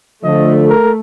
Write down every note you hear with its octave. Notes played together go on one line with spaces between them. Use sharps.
D3 F3 A3 D#5
A#4